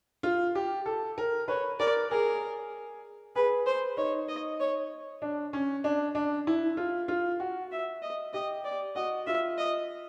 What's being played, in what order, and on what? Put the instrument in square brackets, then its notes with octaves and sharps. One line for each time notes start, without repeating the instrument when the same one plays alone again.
[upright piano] F4
G4
A4
A#4
[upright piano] B4 [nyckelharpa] C#5
[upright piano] A#4 [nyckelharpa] D5
[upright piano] G#4 [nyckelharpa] A#4
[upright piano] G#4 [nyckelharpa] B4
[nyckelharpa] C5
[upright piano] D#4 [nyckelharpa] C#5
[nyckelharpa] D#5
C#5
[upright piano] D4
C#4
D4
D4
E4
F4
F4
F#4
[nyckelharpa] E5
D#5
[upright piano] G4 [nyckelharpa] D#5
[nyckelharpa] D5
[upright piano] F#4 [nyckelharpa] D#5
[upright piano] F4 [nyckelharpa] E5
[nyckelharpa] D#5